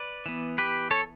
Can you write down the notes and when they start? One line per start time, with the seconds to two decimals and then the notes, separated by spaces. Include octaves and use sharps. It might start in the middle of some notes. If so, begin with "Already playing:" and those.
Already playing: B4 D5
0.26 E3 B3
0.58 G4 B4
0.91 A4 C#5